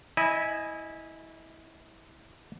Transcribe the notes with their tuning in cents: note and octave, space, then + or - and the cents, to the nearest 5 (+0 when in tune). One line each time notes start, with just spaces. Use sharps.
E4 -20 D#5 +0 G#5 +5